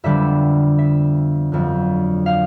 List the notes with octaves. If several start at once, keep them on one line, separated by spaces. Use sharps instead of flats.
F2 D3 G3 B3 D4 E5
E5
G1 F2 D3 F#3
F5